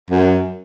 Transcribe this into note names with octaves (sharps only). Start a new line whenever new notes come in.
F#2